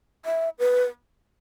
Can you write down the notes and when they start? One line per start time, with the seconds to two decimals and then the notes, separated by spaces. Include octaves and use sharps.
0.26 E5
0.59 B4